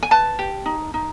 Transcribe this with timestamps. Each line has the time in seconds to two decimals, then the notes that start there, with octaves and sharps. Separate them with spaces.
0.03 G#5
0.11 B4 A5
0.39 G4
0.66 D#4
0.94 D#4